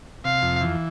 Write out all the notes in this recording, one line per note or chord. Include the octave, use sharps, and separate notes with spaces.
C3 F5
F2
E3